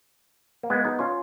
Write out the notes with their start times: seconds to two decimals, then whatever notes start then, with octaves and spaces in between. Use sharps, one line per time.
0.63 A#3
0.70 G#3 B3
0.85 B3 D#4
0.99 C#4 F4